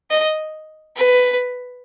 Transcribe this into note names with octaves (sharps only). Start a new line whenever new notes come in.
D#5
B4